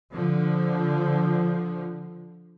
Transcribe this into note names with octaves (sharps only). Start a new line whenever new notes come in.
D3 F3